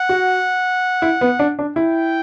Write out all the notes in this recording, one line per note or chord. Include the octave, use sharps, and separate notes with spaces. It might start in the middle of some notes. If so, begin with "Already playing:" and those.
Already playing: F#5
F#4
E4
B3
D4
D4
E4 G5